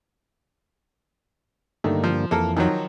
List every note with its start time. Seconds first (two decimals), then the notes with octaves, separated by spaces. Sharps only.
1.84 G2 D3 D#3 A3 A#3
2.04 F3
2.31 F2 E3 A#3 A4 A#4
2.57 D#3 F3 F#3